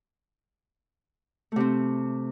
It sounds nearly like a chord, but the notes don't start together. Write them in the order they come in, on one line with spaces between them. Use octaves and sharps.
A3 C3 C4